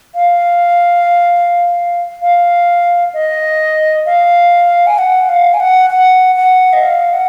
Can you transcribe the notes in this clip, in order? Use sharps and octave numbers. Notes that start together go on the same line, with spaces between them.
F5
F5
D#5
F5
G#5
F#5
F5
G#5
F#5
F#5
F#5
D#5
F5
F#5